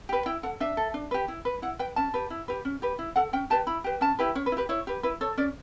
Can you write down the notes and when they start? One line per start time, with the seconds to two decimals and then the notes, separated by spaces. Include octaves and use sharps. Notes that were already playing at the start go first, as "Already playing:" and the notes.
0.09 G4 B4
0.26 E4 G5
0.43 A4 F#5
0.60 D4 E5
0.77 A4
0.94 D4
1.11 G4 B4
1.28 E4
1.45 B4
1.62 E4 F#5
1.79 B4 G5
1.96 C#4 A5
2.14 G4 B4
2.30 E4
2.48 G4 B4
2.65 C#4
2.82 G4 B4
2.99 E4
3.16 A4 F#5
3.33 C#4 G5
3.50 G4 B4 A5
3.67 E4 B5
3.84 G4 B4
4.01 C#4 A5
4.19 E4 G4 B4
4.35 C#4 C#5
4.46 B4
4.52 E4
4.57 G4 B4
4.69 E4 C#5
4.87 G4 B4
5.03 E4 B4
5.21 A4 C#5
5.37 C#4 D5